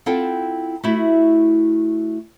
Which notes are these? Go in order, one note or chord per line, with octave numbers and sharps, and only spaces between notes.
C4 E4 F4 A4 F#5 G5
A3 E4 F#4